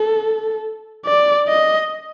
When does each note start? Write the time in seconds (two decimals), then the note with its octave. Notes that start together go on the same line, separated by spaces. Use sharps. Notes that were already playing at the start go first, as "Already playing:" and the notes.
Already playing: A4
1.05 D5
1.48 D#5